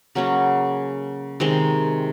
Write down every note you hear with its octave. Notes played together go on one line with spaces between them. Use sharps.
C#3 F#3 A#3 C#4
C3 D#3 G#3